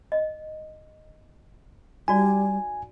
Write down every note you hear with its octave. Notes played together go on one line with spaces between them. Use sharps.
D#5
G3 D#4 F#4 D5 G#5